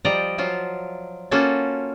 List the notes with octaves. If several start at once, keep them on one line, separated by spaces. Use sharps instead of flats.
F3 G3 D5 D#5 A#5
F3 F#3 F4
A#3 C#4 F4 F#4 A4